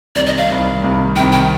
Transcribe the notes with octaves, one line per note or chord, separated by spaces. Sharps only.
C2 C3 D#3 D5
D#5
F5
C2 C3 D#3
C2 C3 D#3
C2 C3 D#3 G5
G5